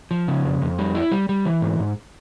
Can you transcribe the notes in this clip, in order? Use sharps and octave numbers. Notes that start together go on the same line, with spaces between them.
F3
C#3
F2
F2
G3
E4
G3
G3
E3
G#2
G#2